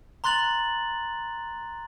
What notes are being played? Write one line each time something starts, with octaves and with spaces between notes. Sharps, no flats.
A#5 C6 F#6 A6 F#7